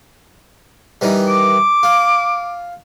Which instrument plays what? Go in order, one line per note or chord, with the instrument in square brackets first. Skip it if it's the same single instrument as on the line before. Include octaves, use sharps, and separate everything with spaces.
[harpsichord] D#3 E3 G3
[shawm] D6
[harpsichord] F4